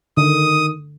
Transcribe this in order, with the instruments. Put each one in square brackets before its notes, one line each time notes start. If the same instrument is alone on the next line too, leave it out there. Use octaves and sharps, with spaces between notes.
[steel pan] D3 [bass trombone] D#3 [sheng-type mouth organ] D#6